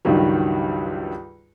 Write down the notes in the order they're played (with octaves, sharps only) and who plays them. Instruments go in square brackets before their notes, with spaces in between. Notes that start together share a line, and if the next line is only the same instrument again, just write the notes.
[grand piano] C#2 G2 D#3 F#3 G3